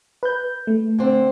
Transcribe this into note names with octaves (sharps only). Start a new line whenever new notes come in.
B4 G6
A3
D3 C4